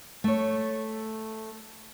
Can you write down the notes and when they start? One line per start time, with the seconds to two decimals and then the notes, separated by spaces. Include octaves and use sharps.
0.24 A3 C#5